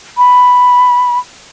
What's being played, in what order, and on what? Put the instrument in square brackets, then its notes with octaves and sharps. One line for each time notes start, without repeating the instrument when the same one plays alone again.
[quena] B5